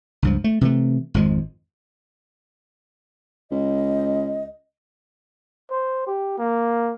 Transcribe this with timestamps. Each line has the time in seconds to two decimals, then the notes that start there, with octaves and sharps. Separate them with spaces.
0.22 C#2 G2 F3
0.44 A3
0.61 C3 E3 F#3 A3
1.14 G#1 F2 F3 G#3
3.51 C#2 D#5
5.71 C5
6.07 G4
6.38 A#3